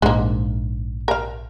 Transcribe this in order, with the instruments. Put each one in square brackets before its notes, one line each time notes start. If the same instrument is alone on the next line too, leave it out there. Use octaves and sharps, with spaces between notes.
[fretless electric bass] A#1 G#2 [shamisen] G#3 A#3
[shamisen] A#4 F5